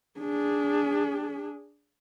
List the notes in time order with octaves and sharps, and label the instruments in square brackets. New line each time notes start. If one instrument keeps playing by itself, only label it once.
[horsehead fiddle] D4 G#4